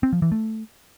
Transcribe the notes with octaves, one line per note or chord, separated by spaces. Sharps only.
C4
F3
E3
A3